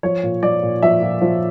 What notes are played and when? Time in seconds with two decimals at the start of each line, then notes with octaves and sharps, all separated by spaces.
0.03 F3 C#5
0.23 A#2
0.42 F3 D5
0.62 A#2
0.82 F3 E5
1.02 A#2
1.21 F3